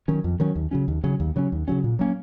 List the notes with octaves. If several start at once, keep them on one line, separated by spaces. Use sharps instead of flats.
D#3 F#3 C#4
F2
D#3 F#3 C#4
D#2
C#3 F#3 C#4
D#2
C#3 F#3 C#4
D#2
C#3 F#3 C#4
D#2
C#3 F#3 C#4
A#2
F#3 A#3 C#4